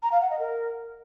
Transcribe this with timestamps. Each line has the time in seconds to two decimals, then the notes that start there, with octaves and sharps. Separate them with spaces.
0.02 A#5
0.12 F5
0.21 F#5
0.30 D#5
0.39 A#4